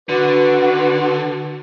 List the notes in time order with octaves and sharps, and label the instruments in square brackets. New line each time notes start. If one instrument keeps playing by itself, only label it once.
[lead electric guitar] D3 [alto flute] F#4 [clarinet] B4